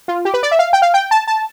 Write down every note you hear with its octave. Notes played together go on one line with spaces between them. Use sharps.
F4
G4
B4
D5
E5
F5
G5
F5
G5
A5
A5